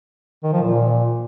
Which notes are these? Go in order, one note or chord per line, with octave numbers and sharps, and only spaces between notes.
D#3
F3
A#2